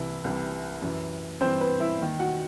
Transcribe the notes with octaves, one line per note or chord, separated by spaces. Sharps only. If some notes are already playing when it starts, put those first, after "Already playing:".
Already playing: C2 C3 E3 E4
C2 C3 E3
F#2 E3
G2 E3 C4 C5
B3 B4
E4 E5
D#2 D#3
F#4 F#5